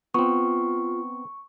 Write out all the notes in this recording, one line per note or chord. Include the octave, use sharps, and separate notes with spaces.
B3 C4 F4 C#6